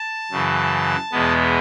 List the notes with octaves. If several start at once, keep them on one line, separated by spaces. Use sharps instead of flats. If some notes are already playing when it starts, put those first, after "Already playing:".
Already playing: A5
F#2 C#3 E3
E2 B2 G#3 B3